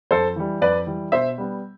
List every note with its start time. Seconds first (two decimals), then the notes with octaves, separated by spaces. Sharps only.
0.11 F2 A4 C5
0.36 E3 G3
0.62 F2 B4 D5
0.87 E3 G3
1.12 B2 C5 E5
1.38 G3 B3